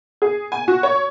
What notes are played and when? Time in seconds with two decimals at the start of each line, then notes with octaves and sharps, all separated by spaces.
0.22 G#4
0.52 G#5
0.68 F#4
0.83 C#5